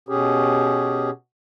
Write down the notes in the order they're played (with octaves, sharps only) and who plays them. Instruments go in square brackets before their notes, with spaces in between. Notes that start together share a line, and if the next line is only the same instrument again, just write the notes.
[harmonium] B2 C#4 G4 G#4